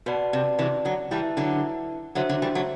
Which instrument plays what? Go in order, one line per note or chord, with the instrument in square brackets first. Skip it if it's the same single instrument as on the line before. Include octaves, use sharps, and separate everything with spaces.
[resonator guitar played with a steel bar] B2 [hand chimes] F#4 B4 D5 F#5 A5
[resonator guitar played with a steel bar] C3
C3 E3
D3 F#3
[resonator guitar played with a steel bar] E3 G3 [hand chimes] E4 B4 E5 A5
[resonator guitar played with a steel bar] D3 F#3
[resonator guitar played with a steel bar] D3 F#3 [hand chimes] F#4 C5 E5
[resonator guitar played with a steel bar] D3 F#3
E3 G3
F#3 A3